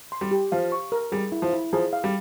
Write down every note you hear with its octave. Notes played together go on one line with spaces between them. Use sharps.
C6
G3
G4
F3 F5
C#6
A#4
G3 G#4
E4
F3
E4
F3 G#4
F5
G3